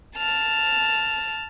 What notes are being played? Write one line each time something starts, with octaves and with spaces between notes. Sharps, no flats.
A5 F6